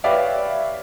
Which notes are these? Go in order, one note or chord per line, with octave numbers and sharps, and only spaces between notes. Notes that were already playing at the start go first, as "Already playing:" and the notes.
G4 B4 C#5 D5 E5 F5